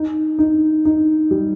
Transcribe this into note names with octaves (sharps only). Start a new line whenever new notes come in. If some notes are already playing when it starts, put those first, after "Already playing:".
Already playing: D#4
D#4
D#4
G3